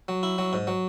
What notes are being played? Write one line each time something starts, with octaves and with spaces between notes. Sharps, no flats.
F#3
E4
F#3
G#2
F#3